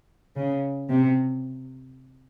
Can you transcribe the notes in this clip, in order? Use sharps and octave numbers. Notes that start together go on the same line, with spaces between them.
C#3
C3